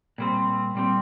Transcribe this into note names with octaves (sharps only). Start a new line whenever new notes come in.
A#2 G3 C4
A#2 G3 C4